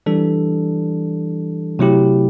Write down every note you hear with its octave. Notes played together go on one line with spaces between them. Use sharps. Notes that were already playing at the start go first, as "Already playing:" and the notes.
E3 G3 D4 A4
C3 F#3 A3 E4 G4